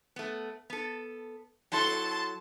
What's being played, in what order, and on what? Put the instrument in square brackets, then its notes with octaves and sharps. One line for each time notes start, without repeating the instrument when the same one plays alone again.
[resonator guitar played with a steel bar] A3 B3
B3 A4
[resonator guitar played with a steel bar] F#3 E4 A4 [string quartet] A5 C6